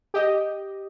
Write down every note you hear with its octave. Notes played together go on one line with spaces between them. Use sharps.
G4 D#5